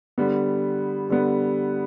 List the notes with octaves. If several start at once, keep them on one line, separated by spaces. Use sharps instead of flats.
D3 G3 B3
D3 G3 B3